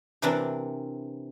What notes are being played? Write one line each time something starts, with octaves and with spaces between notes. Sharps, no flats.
C3 E3 C4 D4 A#4 B4